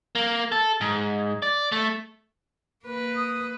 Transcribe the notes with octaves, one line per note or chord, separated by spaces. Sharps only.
A#3
A4
G#2
D5
A3
A#3 B4
D#6